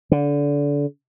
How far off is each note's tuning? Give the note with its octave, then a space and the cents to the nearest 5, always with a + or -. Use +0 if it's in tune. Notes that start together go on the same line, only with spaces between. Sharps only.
D3 -25